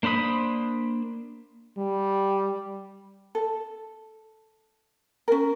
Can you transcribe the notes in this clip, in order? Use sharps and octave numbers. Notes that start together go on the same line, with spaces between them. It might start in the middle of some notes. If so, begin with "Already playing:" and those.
A#3 D4 C5 B5 D#6
G3
A4
C#4 A#4